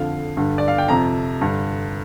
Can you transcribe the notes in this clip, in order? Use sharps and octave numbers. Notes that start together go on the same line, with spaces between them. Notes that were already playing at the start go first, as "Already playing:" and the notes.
Already playing: F2 D3 F5
G2 D3
D5
F5
G5
F2 C3 A#5
G2 D3